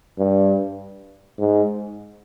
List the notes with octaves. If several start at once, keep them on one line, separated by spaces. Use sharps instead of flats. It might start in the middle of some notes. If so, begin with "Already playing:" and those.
G2
G#2